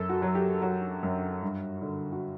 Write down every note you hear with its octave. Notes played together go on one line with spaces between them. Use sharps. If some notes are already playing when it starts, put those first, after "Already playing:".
Already playing: F#2 A4
F#4
F#3
G4
F#3 F#4
F#2
G2
D3
F#4